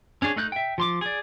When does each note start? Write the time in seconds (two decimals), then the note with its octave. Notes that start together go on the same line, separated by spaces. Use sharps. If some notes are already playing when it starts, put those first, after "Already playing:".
0.22 C#4 D4 G#4 C#5
0.36 A3 D#4 F#6 G6
0.52 E5 G5
0.78 F3 C6 D6
1.01 G#4 D5